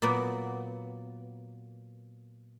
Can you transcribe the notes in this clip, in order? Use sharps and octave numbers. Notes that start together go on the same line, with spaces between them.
A#2 F#3 A#3 B3